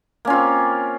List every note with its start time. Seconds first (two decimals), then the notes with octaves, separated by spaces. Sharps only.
0.25 A#3
0.27 C#4
0.30 F4
0.33 C4